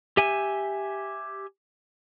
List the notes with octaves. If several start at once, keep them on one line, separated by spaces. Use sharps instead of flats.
G4 E5 G#5